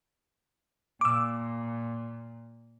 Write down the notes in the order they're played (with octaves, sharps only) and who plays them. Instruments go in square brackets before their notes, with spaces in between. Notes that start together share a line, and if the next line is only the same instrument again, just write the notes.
[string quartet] A#2 [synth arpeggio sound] D6 E6